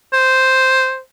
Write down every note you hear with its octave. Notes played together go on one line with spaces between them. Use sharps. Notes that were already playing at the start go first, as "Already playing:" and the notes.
C5